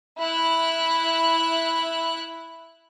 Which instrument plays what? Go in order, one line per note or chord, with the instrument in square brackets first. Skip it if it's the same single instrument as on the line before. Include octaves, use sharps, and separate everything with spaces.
[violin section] E4 F#6